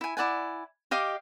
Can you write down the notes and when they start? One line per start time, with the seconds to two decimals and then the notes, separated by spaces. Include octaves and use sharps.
0.01 E4 G#5
0.17 E4 D5 F#5 G#5
0.91 G4 D#5 F5 D6